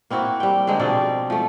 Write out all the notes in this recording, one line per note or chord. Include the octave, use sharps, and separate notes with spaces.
A#3 C4 E4 F#4
G3 G5
D3 G#3 C4 D#4
B2 F3 C4 D5
F3 A3